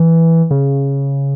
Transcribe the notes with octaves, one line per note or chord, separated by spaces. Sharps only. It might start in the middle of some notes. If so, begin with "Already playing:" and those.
Already playing: E3
C#3